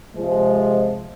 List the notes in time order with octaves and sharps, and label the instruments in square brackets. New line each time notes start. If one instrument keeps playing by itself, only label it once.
[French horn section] C3 F3 G#3